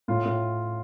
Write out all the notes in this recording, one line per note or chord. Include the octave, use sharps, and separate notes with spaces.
A2 F4
A2